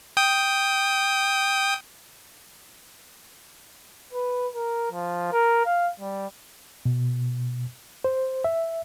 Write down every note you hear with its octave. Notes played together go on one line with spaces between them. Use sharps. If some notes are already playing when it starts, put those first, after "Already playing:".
G5 D#6
B4
A#4
F3
A#4
F5
G3
B2
C5
E5